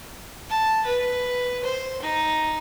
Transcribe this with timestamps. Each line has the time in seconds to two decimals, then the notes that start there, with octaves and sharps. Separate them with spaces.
0.50 A5
0.86 B4
1.64 C5
2.02 D#4